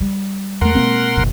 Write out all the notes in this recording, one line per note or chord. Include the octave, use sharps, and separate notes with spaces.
G3
E2 A3 A#4 F#5 C6
B1 B2 G#3 A#3 C4
F#1 B2 D#3